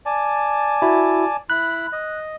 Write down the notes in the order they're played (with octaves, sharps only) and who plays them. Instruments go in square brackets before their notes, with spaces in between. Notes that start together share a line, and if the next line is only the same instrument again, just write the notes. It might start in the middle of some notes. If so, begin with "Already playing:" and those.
[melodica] D5 G#5 A5
[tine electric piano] E4 F#4
[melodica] E4 B5 [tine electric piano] F#6
[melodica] D#5